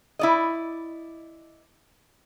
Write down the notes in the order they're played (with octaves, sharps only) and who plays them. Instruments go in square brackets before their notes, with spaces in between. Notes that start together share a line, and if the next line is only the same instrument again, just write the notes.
[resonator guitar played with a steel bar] E4 D5 D#5